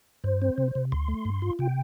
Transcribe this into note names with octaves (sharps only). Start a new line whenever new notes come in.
G2 C5
C4
C3
C3
D2 C6
A3
G2
F4
C3 G5